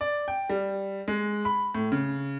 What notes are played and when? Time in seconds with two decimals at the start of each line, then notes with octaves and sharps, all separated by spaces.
0.01 D5
0.28 G5
0.49 G3
1.08 G#3
1.45 B5
1.75 A2
1.92 C#3